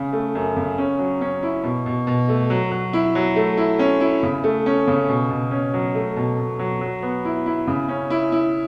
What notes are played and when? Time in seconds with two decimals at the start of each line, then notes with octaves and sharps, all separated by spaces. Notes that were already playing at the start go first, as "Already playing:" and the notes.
Already playing: C#3
0.13 A3
0.35 F#2
0.57 C#3
0.78 C#4
0.99 F#3
1.21 C#4
1.43 E4
1.64 B2
1.86 B2
2.07 B2
2.29 A3
2.50 F#3
2.71 F#3
2.93 E4
3.15 F#3
3.36 A3
3.57 E4
3.79 C#4
4.00 E4
4.23 C#3
4.44 A3
4.66 C#4
4.87 C#3
5.09 B2
5.30 B2
5.51 C#4
5.74 F#3
5.95 A3
6.16 B2
6.39 B2
6.59 F#3
6.81 F#3
7.02 B3
7.25 E4
7.46 E4
7.67 C#3
7.88 C#4
8.10 E4
8.32 E4